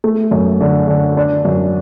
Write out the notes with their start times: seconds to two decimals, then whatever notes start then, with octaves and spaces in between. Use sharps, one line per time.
0.04 A3
0.31 F#2
0.60 D3
0.88 D3
1.17 D4
1.45 F#2